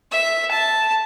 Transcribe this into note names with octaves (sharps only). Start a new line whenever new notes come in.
E5
A5